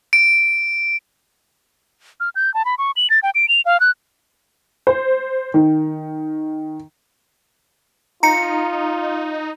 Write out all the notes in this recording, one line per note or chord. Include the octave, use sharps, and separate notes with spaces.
D7
F6
G6
A5
B5
C#6
F#7
A6
G5
D7
F7
F5
F#6
C5
D#3
D#4 F4 A#5 C#7